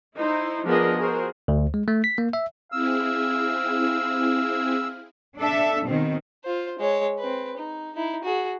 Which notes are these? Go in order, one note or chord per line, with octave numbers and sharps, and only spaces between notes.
D#4 E4 C5
F3 B3 D4 G#4 A#4 D#5
F#4 G#4 A#4 C5
D2
G#3
A3
B6
A#3
E5
C4 E4 G#4 F5 E6
D4 A4 E5
B2 D#3 C4
F4 C5
G#3 C#5
C4 B4
D#4
D#4 E4
F#4 G#4